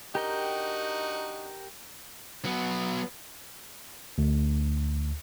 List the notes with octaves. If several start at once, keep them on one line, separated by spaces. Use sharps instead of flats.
D4 D#4 F#4 G4 A#4 G5
F#3 B3
D2